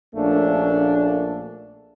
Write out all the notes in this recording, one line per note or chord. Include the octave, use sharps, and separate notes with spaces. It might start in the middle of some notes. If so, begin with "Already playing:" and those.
A#1 A3 A#3 C#4 D4